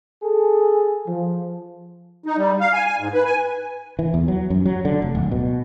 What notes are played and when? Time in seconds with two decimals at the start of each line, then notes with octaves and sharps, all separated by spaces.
0.23 G#4 A4
1.07 F3
2.26 D#4
2.37 G3
2.61 F5
2.74 G#5
2.86 G#5
3.00 G#2
3.13 B4
3.25 G#5
3.99 E3
4.14 E2
4.28 F#3
4.50 F#2
4.65 F#3
4.85 D3
5.02 F1
5.15 D1
5.31 B2